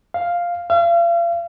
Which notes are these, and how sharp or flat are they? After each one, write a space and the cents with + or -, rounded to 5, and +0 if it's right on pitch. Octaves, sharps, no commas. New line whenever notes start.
F5 +0
F5 -40